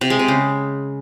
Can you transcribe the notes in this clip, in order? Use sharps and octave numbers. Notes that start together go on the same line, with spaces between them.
C3
G#3
C3
C#3